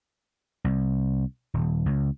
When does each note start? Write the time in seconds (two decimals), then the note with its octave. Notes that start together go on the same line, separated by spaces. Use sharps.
0.64 C2
1.54 D#1
1.86 C#2